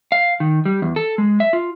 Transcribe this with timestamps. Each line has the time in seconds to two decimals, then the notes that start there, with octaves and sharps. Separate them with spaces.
0.12 F5
0.40 D#3
0.65 G3
0.82 E2
0.96 A4
1.18 G#3
1.40 E5
1.53 F4